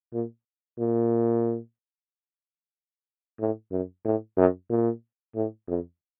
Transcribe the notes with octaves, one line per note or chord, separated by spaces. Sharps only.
A#2
A#2
A2
F#2
A2
F#2
A#2
A2
F2